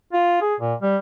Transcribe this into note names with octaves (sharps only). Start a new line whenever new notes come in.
F4
G#4
A#2
G3